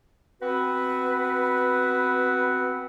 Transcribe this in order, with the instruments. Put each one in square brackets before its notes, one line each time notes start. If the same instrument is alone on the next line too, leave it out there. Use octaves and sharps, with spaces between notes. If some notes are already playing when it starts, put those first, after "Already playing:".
[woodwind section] B3 C4 F#4 B4